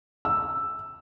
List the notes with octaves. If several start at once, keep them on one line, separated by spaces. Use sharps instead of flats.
E6